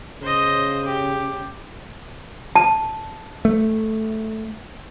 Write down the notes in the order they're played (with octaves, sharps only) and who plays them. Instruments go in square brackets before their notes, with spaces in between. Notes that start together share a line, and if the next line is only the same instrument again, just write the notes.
[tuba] C#3 [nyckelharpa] C5 D#5
[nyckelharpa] G4
[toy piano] A5
[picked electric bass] A3